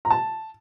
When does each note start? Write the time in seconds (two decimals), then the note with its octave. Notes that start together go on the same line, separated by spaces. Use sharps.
0.05 A#5
0.10 A5